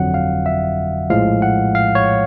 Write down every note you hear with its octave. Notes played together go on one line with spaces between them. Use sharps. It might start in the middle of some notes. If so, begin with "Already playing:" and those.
Already playing: G1 F2 D3 F#3 F#5
F5
E5
A#1 A2 F3 G#3 F5
F#5
F5
C#5